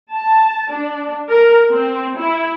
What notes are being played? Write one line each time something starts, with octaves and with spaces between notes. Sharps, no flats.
A5
D4
A#4
C4
E4